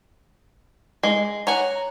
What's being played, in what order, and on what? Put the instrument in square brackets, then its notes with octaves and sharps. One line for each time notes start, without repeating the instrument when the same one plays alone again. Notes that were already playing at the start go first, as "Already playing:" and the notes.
[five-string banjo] G#3
[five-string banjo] C#5 G#5 [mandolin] F#5 A#5